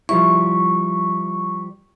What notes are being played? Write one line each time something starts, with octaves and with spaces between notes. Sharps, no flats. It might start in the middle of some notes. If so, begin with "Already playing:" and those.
F3 G3 E4 C#6